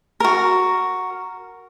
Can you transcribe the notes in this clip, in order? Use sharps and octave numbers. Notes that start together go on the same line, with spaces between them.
F#4 A#4